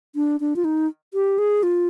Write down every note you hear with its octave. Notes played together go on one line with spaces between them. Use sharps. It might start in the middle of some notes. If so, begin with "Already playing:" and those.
D4
D4
F4
D#4
G4
G#4
F4